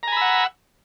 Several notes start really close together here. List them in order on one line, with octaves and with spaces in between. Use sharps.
A#5 G#5 B5 E6 F#5